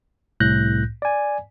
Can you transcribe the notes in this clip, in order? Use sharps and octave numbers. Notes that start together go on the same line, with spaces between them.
C2 A2 F#6 G6 A#6
D5 G#5